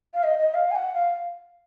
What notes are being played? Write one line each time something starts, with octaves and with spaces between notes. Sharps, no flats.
F5
D#5
D#5
F5
G#5
F#5
F5